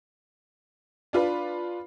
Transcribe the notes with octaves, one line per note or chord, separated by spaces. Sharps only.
D4 F4 B4